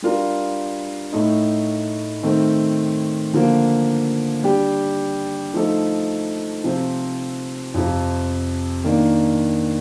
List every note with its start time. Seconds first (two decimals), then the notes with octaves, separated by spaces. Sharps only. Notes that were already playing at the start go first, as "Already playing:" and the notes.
0.02 G3 D4 F4 A#4
1.12 A2 A3 D#4
2.23 D#3 A3 C4
3.33 D3 F3 A#3
4.43 G3 D4 G4
5.54 F3 A3 D#4 A4
6.64 C3 F3 C4
7.74 F2 C3 F3
8.84 D#3 A#3 D4